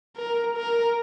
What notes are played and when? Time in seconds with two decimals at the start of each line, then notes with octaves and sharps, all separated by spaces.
0.16 A#4
0.56 A#4